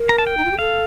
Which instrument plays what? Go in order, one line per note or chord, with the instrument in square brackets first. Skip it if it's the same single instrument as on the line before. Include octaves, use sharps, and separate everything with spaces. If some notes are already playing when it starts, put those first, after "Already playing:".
Already playing: [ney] A#4
[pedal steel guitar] A#5
A5
G5
[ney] D#4
F4
G4
[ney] A4 [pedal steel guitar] F5